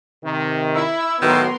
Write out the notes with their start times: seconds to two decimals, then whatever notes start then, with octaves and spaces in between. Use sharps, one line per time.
0.24 C3 D#3
0.75 E4 E6
1.22 A2 D#3 F#3 B3 F#4 A#4 C6